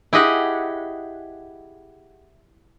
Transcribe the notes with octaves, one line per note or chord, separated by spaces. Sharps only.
E4 G4 G#4 D#5 F#5